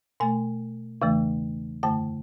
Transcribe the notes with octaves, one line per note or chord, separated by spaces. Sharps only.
B2 A3 G#5
E2 C#3 E3 A3
F#2 D3 A3 A5